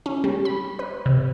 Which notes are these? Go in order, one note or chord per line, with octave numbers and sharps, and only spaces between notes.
C#4
G3
B5
B4
C3